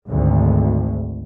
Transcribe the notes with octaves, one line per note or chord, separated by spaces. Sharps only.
G#1 D2